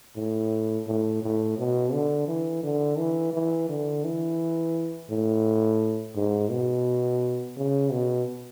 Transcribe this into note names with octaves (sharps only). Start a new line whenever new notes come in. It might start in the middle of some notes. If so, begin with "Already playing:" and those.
A2
A2
A2
B2
D3
E3
D3
E3
E3
D3
E3
A2
G#2
B2
C#3
B2